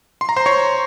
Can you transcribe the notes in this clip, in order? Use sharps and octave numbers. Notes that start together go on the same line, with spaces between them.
C6
A#5
C5 C6
C#5 C#6